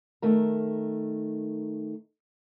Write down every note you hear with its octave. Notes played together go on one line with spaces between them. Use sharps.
D#3 A3 A#4